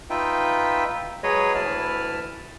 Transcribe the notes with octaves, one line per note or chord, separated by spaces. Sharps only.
D#4 F4 B4 E5 G5
F#3 G#3 G#4 B4 C#5 D#5
D2 E3 E4 B4 A5 F6